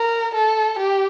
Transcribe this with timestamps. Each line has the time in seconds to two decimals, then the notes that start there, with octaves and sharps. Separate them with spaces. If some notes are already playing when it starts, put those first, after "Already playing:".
Already playing: A#4
0.34 A4
0.79 G4